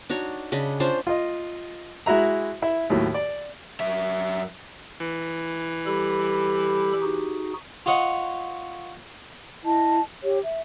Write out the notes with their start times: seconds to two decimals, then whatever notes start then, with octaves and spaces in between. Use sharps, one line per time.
0.09 D4 D#4 F#4 C#5
0.52 C#3 D4 D#5 B5
0.80 C#4 D4 F4 C5
1.07 F4 D#5
2.06 G#3 E4 F#4 E5 A#5
2.62 E4 E5
2.90 D#2 A2 F#3
3.14 D5
3.80 F#2 E5
5.00 E3
5.86 G3 G4 A4 B5
7.02 D#4 F#4 G#4
7.86 F4 C#5 D#5 F#5
9.64 E4 D#5 A5
10.23 G4 C#5
10.43 E5